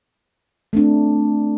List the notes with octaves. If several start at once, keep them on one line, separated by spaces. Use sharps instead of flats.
A3 C4 D4